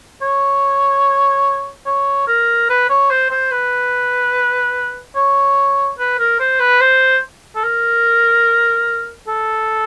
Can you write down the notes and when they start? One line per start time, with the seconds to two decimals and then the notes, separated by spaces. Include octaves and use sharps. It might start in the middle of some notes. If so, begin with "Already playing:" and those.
0.22 C#5
1.86 C#5
2.28 A#4
2.69 B4
2.89 C#5
3.10 C5
3.31 C5
3.51 B4
5.16 C#5
5.99 B4
6.19 A#4
6.40 C5
6.60 B4
6.81 C5
7.55 A4
7.63 A#4
9.28 A4